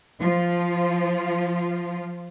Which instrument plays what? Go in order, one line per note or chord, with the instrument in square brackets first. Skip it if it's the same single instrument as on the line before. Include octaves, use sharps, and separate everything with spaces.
[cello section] F3 F4